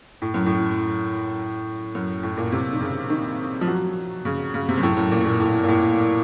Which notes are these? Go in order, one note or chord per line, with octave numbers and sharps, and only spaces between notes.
A2
F#2
A2
F#2
A2
A#2
C3
D#3
C#3
D#3
F3
F#3
C#3
C#3
C3
F#2
A2
F#2
A#2
A#2
A2
A#2
A2